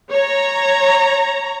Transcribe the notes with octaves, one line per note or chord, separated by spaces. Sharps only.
C#5 A#5